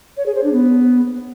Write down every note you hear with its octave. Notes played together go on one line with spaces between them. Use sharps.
C#5
G#4
C5
D4
B3